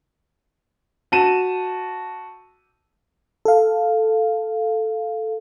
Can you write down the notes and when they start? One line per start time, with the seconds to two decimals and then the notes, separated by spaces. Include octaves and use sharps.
1.12 F#4 A5 D#7 E7
3.45 A4 F5